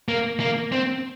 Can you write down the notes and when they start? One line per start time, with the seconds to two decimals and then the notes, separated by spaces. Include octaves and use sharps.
0.08 A#3
0.40 A#3
0.72 C4